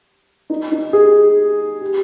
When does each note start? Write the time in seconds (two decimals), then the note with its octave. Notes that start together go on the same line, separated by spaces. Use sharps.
0.50 D#4
0.72 D#4
0.93 G#4
1.81 G4